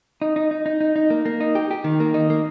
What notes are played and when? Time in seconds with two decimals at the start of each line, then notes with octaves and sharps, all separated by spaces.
0.21 D#4
0.36 D#4
0.51 D#4
0.66 D#4
0.81 D#4
0.96 D#4
1.10 A#3
1.25 A#3
1.40 D#4
1.55 G4
1.71 G4
1.84 D#3
2.00 A#3
2.14 D#4
2.30 A#3